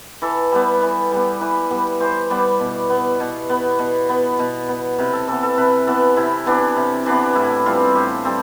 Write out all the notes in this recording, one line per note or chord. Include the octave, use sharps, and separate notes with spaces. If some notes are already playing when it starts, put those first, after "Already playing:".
E3 A4
G3 B3
E3
G3 B3
E3 B4
G3 B3
E3 C5
G3 B3 D5
B2
B3
B2
B3
B2
B3
B2
B3
C3 B4
A4
E3 B3 A4
A4
C3 B4
E3 B3 A4
C3 E4
E3 B3 D4
C3
E3 B3 D4
A2 E4
E3 G3 C4 F4
A2 G4
G3 C4 A4